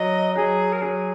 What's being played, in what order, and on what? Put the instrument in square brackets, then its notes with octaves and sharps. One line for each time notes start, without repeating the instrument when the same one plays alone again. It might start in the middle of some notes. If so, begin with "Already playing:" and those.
Already playing: [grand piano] F#3 [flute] D#5
[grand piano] F#3 [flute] G#4
[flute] A#4
[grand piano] F#3 [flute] G#4